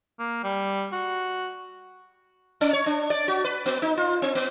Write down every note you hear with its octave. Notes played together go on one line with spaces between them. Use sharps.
A#3
G3
F#4
C#4
C#5
D4
D5
F#4
B4
B3
D#4
F4
C4
B3